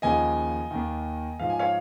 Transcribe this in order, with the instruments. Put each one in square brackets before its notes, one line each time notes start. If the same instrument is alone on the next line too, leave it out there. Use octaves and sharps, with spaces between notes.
[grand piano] D#2 C#3 F3 D#5 G#5
D#2 D#3
G#2 F3 F5
G#5
C#5 F5